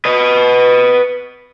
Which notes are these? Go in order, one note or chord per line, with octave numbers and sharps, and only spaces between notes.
B4 D#5